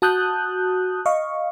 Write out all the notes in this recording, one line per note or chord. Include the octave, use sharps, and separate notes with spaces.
F#4 A5 D#6 F#6 G6
D#5 F5 C#6